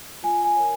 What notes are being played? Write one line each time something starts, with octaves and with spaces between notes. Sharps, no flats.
F4 G#5
G#5
A#4 C#5